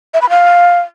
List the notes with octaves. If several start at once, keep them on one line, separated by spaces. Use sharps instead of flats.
E5
B5
F5